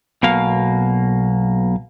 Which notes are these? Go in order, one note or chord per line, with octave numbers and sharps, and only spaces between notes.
B1 B2 A#3 F5